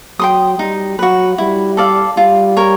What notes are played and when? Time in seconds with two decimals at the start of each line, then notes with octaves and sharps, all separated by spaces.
0.19 F#3 G5 C6 D#6
0.59 G3 D#4
0.99 F#3 F#4 B4
1.38 G3 E4
1.77 A4 D5 F5
2.17 G3 F4
2.57 A#4 C#5